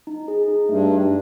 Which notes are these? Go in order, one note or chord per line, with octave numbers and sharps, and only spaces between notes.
D#4
G#4
D#4
G2 A3
G4